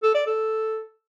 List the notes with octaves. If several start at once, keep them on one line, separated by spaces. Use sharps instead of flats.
A4
D5
A4